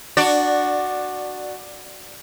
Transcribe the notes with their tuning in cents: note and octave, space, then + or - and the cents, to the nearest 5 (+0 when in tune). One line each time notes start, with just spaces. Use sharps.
D4 +15 F#4 +0 D5 +0